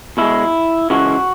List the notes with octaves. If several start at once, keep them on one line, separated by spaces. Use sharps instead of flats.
B2 G#3 E4
C#3 E3 G#3 F#4